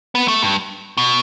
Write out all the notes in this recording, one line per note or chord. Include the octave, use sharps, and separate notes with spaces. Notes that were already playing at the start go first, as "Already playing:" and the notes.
B3
A3
G2
B2